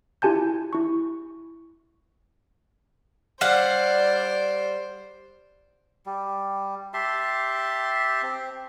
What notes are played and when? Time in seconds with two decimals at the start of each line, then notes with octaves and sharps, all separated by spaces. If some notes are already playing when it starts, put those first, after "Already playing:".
0.22 E4 F4 G4 G#5 A5 G6
0.73 E4 C#6
3.41 G3 C5 D5 F5 F#5
6.06 G3
6.94 G4 E5 A5 C6
8.22 C4